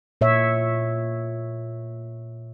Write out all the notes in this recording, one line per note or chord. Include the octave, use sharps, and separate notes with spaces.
A#2 C#5 E5